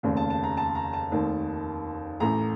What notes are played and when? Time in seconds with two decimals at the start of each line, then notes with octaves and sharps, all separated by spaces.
0.03 F1 D#2 C#3
0.17 A5
0.30 A5
0.43 A#5
0.57 A5
0.75 A#5
0.93 A5
1.11 F1 D#2 D#3
2.20 A1 A2 A#5